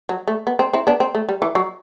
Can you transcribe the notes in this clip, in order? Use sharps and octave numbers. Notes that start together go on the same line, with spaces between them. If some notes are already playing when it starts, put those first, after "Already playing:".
F#3
A3
B3
C4
C4 E4
B3 D4
C4
A3
G3
E3
F#3